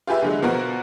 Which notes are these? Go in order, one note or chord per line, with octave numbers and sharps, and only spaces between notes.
F4 G4 G#4 B4 E5
D3 F#3 G#3
B2 F3 A#3 B3 F#4 A#4